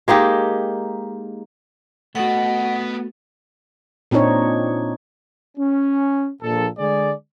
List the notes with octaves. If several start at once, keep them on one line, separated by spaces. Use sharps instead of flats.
G#3 A#3 D#4 G4
A3 B3 F#4 D#5 F#5
A#2 C4 D4 D#4 C#5
C#4
A#1 A#2 A4
D3 G#3 G#4 D5